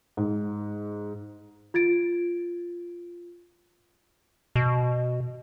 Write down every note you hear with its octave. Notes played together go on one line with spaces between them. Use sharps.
G#2
F4 G#6 A6 D7
B2